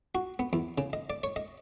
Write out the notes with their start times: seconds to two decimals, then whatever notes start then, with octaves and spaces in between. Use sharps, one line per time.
0.15 F#4
0.39 B3
0.53 E2
0.78 C#3
0.93 D#5
1.10 D5
1.23 C#5
1.36 D#5